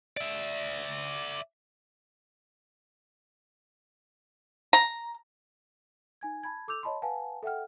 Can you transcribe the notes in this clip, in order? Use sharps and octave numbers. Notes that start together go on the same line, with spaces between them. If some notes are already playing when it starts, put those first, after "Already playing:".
D5 E5
A#5
D#4 G#5 G#6
A5 B5 G#6
A4 D6 E6 G6 F7
C#5 D#5 A5 B5 C6
B4 F5 F#5 G#5 A5
A4 E5 F#5 G5 F6